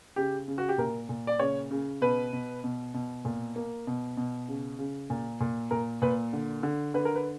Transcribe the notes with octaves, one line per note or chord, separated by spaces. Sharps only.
C#3 G4
C#3
F#4
G4
A#2 A#4
A#2
D5
C#3 C#5
C#3
B2 B4
B2
B2
B2
A#2
A#3
B2
B2
C#3
C#3
A#2
A#2
A#2 A#4
A#2 B4
D3
D3
D3 B4
A#4
B4